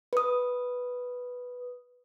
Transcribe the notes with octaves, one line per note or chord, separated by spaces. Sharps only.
B4 D#6